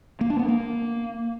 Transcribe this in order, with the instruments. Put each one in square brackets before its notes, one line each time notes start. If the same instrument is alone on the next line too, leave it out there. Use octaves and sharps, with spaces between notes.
[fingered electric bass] A#3
D4
B3
A#3